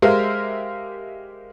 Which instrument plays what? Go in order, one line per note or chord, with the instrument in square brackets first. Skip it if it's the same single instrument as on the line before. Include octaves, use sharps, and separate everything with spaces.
[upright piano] G#3 G4 A#4 C5 E5 F5